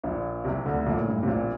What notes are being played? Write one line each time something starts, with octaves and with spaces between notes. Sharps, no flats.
A#1 A#2
C2 C3
D2 D3
A#1 A#2
A2
G2
A2
C3
A#1 A#2